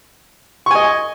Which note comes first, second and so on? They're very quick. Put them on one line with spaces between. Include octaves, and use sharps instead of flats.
C#6 G#5 D#5